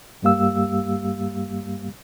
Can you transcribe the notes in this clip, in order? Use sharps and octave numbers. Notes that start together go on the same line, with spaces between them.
G2 G3 A#3 G4 F5 E6